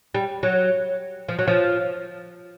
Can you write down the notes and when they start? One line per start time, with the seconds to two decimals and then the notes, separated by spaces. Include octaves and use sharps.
0.15 G3
0.43 F#3
1.29 F3
1.39 F#3
1.48 F3